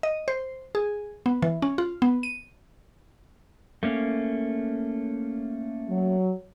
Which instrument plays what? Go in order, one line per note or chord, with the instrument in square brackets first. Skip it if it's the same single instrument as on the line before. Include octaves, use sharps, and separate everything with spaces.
[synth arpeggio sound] D#5
C5
G#4
B3
E3
C#4
F4
B3
D#7
[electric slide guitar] A3 A#3 C#4
[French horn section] F#3